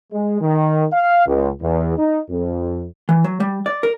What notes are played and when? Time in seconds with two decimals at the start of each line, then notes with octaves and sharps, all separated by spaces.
0.13 G#3
0.41 D#3
0.93 F5
1.27 C#2
1.61 E2
1.98 D#4
2.29 F2
3.09 E3
3.24 F#3
3.40 G3
3.66 D5
3.83 A#4